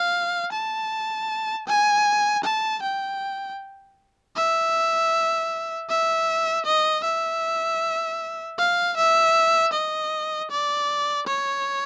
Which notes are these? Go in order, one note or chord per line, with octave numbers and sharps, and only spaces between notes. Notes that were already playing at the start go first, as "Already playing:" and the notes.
Already playing: F5
A5
G#5
A5
G5
E5
E5
D#5
E5
F5
E5
D#5
D5
C#5